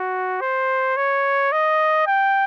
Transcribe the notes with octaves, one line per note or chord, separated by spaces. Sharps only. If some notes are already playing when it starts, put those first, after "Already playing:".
Already playing: F#4
C5
C#5
D#5
G5